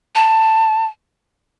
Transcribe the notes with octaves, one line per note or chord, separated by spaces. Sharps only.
A5